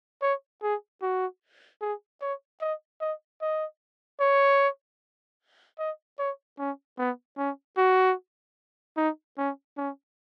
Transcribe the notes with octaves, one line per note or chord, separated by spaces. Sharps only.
C#5
G#4
F#4
G#4
C#5
D#5
D#5
D#5
C#5
D#5
C#5
C#4
B3
C#4
F#4
D#4
C#4
C#4